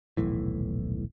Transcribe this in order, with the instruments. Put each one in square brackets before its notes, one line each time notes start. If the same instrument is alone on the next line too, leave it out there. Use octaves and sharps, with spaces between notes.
[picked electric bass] D#1 B1 A2 E3